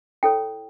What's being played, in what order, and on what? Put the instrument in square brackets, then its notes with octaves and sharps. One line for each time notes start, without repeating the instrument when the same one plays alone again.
[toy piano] E4 A4 C#5 G5